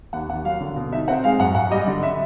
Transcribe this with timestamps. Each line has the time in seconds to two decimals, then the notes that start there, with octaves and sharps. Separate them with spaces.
0.13 D#2 F#5
0.29 D#2 F#5
0.45 F#3 F5
0.61 D3
0.76 B2
0.92 D#4 E5
1.08 C4 F#5
1.24 G#3 F5
1.39 F#2 F#5
1.55 F#2 F#5
1.71 G3 D#5
1.87 D3
2.03 E5